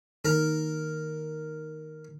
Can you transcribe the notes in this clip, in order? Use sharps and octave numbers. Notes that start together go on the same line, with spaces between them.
D#3 A#4